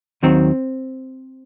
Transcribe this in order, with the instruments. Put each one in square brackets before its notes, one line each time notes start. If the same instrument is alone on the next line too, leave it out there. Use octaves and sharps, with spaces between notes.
[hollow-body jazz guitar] D#2 D#3 F#3 C4